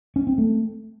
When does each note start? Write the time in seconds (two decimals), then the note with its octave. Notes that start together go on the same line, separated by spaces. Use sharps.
0.16 C#4
0.27 C4
0.38 A3